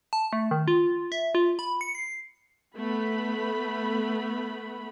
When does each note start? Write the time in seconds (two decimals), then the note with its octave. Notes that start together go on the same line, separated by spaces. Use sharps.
0.13 A5
0.33 A3
0.51 D#3
0.68 F4
1.12 E5
1.35 F4
1.59 B5
1.81 C#7
1.95 C7
2.75 A3 B3 B5